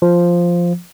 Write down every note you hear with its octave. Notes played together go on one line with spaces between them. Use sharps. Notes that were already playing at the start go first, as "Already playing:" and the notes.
F3